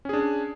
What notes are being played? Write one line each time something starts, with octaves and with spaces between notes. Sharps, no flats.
C#4 D4 G#4